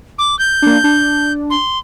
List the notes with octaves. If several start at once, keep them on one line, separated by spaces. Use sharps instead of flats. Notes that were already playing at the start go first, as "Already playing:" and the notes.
D6
G6
A#3 D4
D4
C6